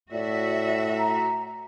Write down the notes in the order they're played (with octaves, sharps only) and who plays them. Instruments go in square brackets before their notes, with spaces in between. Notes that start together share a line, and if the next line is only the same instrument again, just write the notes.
[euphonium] A2 [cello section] F#4 E5 [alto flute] D5
[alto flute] A#5